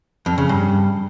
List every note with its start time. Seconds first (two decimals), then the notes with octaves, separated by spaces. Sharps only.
0.26 F2
0.38 C#3
0.49 G2